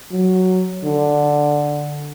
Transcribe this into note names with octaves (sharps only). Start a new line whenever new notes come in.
F#3
D3